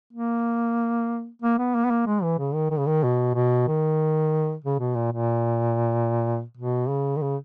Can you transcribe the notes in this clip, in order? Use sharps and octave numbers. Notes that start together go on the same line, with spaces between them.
A#3
A#3
B3
A#3
B3
A#3
G#3
E3
C#3
D#3
D#3
C#3
D#3
B2
B2
D#3
C#3
B2
A#2
A#2
B2
C#3
D#3
C#3